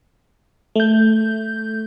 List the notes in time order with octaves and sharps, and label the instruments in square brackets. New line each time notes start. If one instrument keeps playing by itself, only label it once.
[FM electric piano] A3 G6